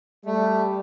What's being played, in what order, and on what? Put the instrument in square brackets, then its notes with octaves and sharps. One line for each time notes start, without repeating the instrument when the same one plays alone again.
[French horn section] G3 [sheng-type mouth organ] A3